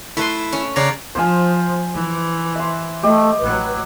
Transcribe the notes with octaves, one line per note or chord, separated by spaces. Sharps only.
A3 E4 B4 C6
C#4
C#3 C#5 D5 F5 F#5 A#5
F3 C5 G#5
E3
E5 C6
A3 G4 D#5
A1 F#3 B4